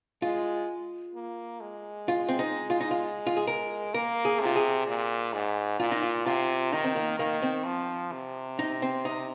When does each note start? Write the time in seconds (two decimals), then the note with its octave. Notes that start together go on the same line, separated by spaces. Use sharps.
0.22 G#3 F4
1.15 A#3
1.61 G#3
2.08 F4
2.28 C4
2.39 D#4
2.70 F4
2.80 D#4
2.91 F4
3.27 F4
3.37 G#4
3.47 A#4
3.94 A#3 A#4
4.25 G#4
4.40 C3
4.45 F4
4.56 G#4
4.87 A#2
5.33 G#2
5.80 A#2 F4
5.92 D#4
6.03 F4
6.26 C3 F4
6.73 D#3 D#4
6.84 C4
6.96 A#3
7.19 D#3 A#3
7.42 C4
7.66 F3
8.12 C3
8.59 D#4
8.82 C4
9.05 D#4